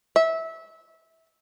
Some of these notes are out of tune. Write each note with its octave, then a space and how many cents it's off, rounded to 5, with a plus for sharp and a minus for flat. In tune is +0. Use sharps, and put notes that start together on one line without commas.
E5 -20